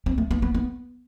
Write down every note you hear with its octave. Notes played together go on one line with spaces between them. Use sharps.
C4
A3
B3
B3
B3